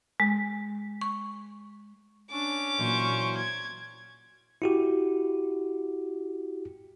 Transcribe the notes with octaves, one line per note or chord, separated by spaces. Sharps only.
G#3
C#6
C#4 D4 D6
A#2 E3 F#3 C5 C#6
G#6
E4 F#4 G4